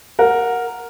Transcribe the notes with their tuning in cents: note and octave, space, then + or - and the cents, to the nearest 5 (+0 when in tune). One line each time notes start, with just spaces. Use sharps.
A#4 +0 F#5 -20